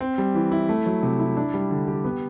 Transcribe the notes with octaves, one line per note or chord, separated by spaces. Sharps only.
C4
G3
E3
E4
A3
F#3
C3
E4
D4
G3
D3
G4
B3